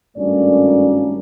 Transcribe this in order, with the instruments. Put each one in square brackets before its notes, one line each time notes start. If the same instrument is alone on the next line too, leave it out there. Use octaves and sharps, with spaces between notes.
[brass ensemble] G#1 G2 A3 A#3 C#4 D5